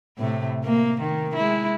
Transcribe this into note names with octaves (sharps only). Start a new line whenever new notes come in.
A2 C3 A3
A#3
D#3
G#3 E4